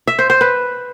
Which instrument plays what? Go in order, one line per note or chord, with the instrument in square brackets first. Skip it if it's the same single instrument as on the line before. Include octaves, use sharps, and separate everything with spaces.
[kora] E5
C5
C5
B4